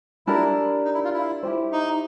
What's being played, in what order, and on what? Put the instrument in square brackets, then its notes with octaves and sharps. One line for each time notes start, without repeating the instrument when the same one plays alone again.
[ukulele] D4 G4 A#4 [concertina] E4
[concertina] D#4
E4
F4
E4
[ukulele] E4 G4 C5
[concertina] D#4